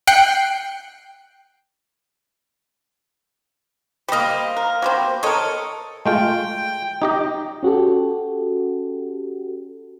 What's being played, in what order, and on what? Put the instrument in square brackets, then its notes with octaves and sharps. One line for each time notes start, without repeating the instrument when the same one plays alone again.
[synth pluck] G5 F#6 C7 C#7
[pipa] G3 D#5 [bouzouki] A#3 C5
[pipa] A#4
F#3 G3 C4
[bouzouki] A4 D#5 [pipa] A#4 C#5
[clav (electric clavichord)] G#3 A3 F4 [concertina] G5
[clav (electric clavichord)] D#4 G4 D#5
[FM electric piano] C#4 F#4 G4 A4